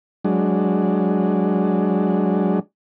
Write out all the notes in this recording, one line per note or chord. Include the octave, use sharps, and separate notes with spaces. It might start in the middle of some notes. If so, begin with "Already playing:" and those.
F#3 G#3 D4